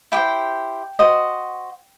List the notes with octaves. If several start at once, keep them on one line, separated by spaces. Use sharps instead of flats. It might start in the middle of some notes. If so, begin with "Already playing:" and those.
E4 G4 C5 G5
F#4 C5 D#5